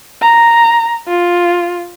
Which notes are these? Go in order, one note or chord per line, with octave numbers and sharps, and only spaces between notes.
A#5
F4